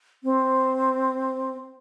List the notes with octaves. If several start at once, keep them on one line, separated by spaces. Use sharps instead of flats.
C4